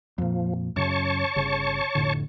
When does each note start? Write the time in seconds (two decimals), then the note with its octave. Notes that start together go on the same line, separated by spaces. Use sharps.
0.18 F2 A#2 F3
0.76 F#2 C#3 C#5 A5 C#6
1.36 G1 C#3
1.95 F1 A2 D3